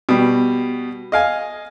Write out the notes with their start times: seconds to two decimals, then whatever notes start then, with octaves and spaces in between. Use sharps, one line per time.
0.09 B2 G3
1.12 D#5 F5 G#5